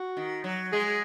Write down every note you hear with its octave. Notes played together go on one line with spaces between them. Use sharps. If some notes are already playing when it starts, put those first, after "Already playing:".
Already playing: F#4
D#3
F#3
G#3 G#4